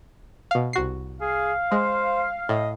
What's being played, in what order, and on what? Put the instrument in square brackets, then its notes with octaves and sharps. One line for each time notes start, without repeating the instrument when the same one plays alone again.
[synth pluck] B2 F5
C2 F#4 C7
[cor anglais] G#4 [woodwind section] F5
[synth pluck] G#3 [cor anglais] C5
[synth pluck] A2 [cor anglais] D#5